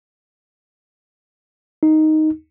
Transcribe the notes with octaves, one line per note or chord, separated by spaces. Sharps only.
D#4